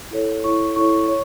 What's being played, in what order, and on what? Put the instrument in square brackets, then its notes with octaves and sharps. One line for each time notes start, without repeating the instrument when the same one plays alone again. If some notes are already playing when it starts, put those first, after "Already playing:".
[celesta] E4 A4 C#5
E4 A4 C#5 C#6
E4 A4 C#5 C#6
C#5